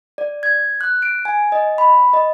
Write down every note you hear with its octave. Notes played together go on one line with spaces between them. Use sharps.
D5
G#6
F#6
D7
G#5
D#5
B5
D#5